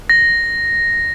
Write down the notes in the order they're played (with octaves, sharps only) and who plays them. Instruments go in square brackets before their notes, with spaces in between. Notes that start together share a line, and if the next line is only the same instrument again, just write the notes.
[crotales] A#6